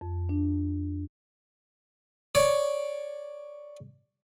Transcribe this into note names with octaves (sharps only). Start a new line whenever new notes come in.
F2
D4
C#5 D5